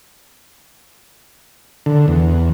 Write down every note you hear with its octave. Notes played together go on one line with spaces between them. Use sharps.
D3
E2